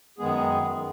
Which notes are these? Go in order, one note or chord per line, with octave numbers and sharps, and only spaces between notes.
F#2 D#3 G#3 B3 G#4